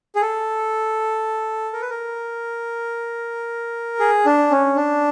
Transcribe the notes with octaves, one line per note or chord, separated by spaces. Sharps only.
G#4
A4
A#4
B4
A#4
G#4
D4
C#4
D4